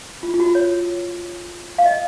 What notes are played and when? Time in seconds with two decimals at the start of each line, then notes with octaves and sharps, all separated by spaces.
0.23 F4
0.34 F4
0.40 F#4
0.55 C#5
1.78 F5
1.86 D#5